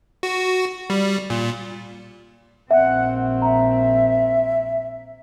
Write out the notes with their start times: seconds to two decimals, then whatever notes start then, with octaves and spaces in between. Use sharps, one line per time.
0.23 F#4
0.90 G3
1.30 A#2
2.71 A#1 C4 E5 F#5
3.42 E5 A#5